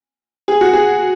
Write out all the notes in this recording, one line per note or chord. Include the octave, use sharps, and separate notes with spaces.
G#4
F#4
G#4